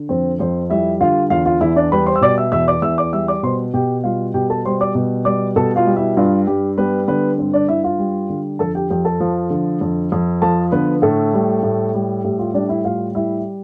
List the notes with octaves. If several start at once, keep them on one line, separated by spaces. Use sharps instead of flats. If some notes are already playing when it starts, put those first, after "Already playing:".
Already playing: D3
F2 C4 C5
F2 C4 C5
G3 E4 E5
D3 F4 F5
E2 F4 F5
F4 F5
E2 E4 E5
D4 D5
G3 B4 B5
C5 C6
E6
B2 D5 D6
E5 E6
E2 E5 E6
D5 D6
E2 E5 E6
D5 D6
G3 E5 E6
D5 D6
B2 C5 C6
B2 G4 G5
G3 F4 F5
B2 G4 G5
A4 A5
G3 C5 C6
D5 D6
B2
G3 D5 D6
B2 A4 A5
F4 F5
G3
E4 E5
G2 F4
G2 G4
G3 B3 B4
D3 B3 B4
G2 C4 C5
D4 D5
G2 E4 E5
F4 F5
G3
D3
F2 A4 A5
G4 G5
F2 G4 G5
A4 A5
F3
D3
F2
F2
F3 A4 A5
D3 B3 B4
A2 A3 A4
G3
A2
G3
A2 G4
F4
G3 D4 D5
E4 E5
A2 F4 F5
G3 E4 E5